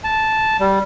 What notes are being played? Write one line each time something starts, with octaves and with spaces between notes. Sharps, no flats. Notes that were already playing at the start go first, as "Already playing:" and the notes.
A5
G3